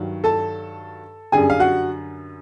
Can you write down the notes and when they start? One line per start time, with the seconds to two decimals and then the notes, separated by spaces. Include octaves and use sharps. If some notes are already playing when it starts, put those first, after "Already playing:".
Already playing: G2 D#3 F#3
0.24 A4 A5
1.32 F#2 D3 G3 G#4 G#5
1.50 F5
1.59 F#4 F#5